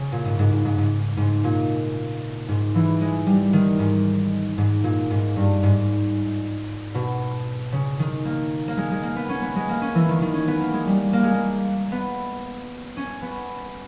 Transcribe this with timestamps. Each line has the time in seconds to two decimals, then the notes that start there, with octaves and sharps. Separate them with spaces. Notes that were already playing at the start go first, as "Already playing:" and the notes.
Already playing: C#3
0.12 A#2
0.25 G#2
0.39 G#2
0.53 G#2
0.65 G#2
0.78 G#2
1.17 G#2
1.44 A#2
2.48 G#2
2.75 E3
3.01 G#3
3.26 G3
3.53 D#3
3.79 G#2
4.58 G#2
4.84 A#2
5.10 G#2
5.36 G2
5.63 G#2
6.94 B2
7.72 C#3
7.99 D#3
8.25 A#3
8.68 A#3
8.77 G#3
8.91 G#3
9.03 A#3
9.16 B3
9.29 C#4
9.42 B3
9.56 G#3
9.69 A#3
9.82 C#4
9.95 E3
10.08 D#3
10.22 D#3
10.34 C#4
10.47 B3
10.61 A#3
10.73 G#3
10.87 G3
11.13 A#3
11.23 G#3
11.34 A#3
11.92 B3
12.97 C#4
13.22 B3